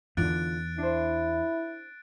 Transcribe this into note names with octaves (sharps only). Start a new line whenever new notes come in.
E2 D3 D#4 F4 F#6 A6 D7
D4 E4 C5